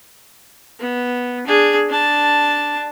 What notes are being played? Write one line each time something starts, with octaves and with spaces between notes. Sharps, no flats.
B3
D4 G#4
D4 A5